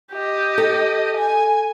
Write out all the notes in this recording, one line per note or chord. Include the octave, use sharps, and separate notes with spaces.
G4 D#5
A4
G#5